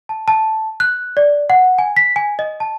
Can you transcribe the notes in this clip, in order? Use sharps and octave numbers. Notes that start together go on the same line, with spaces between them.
A5
A5
F#6
D5
F#5
G#5
B6
G#5
D#5
A5